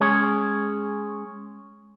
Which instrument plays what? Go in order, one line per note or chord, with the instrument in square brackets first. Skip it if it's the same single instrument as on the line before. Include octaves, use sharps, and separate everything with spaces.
[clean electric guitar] G#3 C#4 G#4 C#5